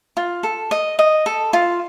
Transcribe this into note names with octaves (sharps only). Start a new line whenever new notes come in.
F4
A4
D#5
D#5
A4
F4